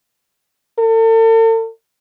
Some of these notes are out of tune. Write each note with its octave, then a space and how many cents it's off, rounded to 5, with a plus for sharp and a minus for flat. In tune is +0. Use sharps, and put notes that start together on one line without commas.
A4 +40